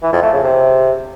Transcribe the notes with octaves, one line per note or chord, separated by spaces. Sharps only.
E3
F2
A3
C#3
C3